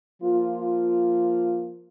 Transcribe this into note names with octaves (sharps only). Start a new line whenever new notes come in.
F3 A#3 F4